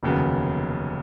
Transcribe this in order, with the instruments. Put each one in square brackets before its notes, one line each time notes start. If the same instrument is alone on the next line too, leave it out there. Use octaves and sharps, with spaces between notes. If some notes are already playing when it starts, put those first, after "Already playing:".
[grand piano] F1 D#2 C#3 F#3 B3